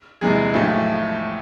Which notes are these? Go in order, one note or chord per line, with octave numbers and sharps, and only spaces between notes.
E1 E2 C3 E3 G#3 G#4
B1 A2 F3 A3